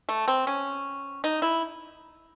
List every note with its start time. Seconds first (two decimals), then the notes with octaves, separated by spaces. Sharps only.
0.09 A3
0.28 C4
0.47 C#4
1.24 D#4
1.42 E4